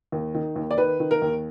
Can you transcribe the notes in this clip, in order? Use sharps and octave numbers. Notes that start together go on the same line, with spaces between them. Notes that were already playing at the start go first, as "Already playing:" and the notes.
D#2
D#3
D#2
D5
D#3 B4
D#3
A#4
D#2